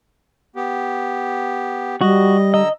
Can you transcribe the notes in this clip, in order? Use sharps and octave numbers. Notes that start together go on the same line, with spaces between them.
B3 G4
G3 F#4 D#5
D3 D#5 A#5 E6